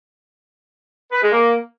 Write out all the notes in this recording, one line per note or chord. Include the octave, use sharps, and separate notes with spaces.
B4
G#3
A#3